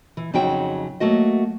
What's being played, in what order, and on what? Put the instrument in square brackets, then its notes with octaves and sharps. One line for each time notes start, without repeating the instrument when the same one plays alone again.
[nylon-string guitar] E3
F2 C#3 F#3 D#4 F#4 G5
F#3 A3 A#3 F#4 D#5